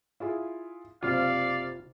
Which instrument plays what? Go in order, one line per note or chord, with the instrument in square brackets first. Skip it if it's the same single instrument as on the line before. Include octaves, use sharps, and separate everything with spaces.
[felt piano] E4 F4 G#4
[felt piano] F#1 C3 [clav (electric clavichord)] F4 [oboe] D5 [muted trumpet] F5